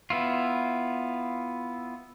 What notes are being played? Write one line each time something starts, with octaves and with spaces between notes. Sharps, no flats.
B3 E4 F4